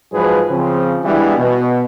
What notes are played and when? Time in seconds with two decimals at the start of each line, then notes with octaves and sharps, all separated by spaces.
0.12 G#2 F3 F#3 G#4 B4
0.50 C#3 F3 C4
1.05 E3 G3 G#3 B3 D4 E4
1.38 B2